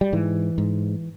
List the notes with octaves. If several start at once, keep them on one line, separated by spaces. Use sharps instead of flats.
G3
G#2 E3
G#2